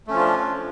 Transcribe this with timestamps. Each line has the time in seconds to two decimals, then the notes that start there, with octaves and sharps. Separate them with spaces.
0.07 A3
0.10 C#4
0.13 F3
0.16 F4
0.19 D4